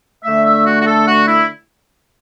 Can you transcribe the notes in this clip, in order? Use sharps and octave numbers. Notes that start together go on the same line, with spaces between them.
D3 A3 E5
E5
F#4
F#4
A4
F#4
E4